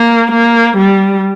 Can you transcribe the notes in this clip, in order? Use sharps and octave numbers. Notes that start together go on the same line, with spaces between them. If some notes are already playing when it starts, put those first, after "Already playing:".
Already playing: A#3
A#3
G3